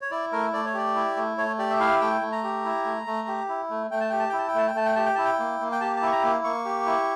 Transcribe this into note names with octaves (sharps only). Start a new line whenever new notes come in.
C#5
E4 D5
A3 A#4
A3 D5
C#5
G4 D5
E4
A3
A3 C#5
G4 D5
E5
E4 F5
A3 G5
A3
A#5
G4
E4
A3
A3
G4
E4
A3
A3 G5
A5
G4 G5
A5
E4 G5
A5
G5
A3 A5
G5
A3 A5
G5
G4 A5
G5
E4 A5
G5
A#3
A#3
G5
G4 A5
A5
E4 C#6
A#5
A#3
A#3 C#6
G4
E4